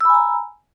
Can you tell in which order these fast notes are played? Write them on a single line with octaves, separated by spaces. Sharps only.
E6 B5 G#5 A#5